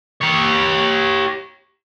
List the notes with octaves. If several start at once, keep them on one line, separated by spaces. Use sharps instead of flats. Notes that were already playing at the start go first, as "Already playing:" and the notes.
G4 C#5